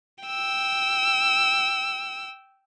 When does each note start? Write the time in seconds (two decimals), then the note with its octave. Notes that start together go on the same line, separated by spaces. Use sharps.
0.25 G5 E6